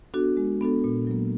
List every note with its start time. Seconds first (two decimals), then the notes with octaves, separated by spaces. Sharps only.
0.14 B3 D4 F#4 A4
0.37 G#3
0.61 B3 D4 F#4 A4
0.84 A#2
1.07 F#3 A#3